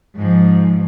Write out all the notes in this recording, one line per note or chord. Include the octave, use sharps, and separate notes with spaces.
G#2 F3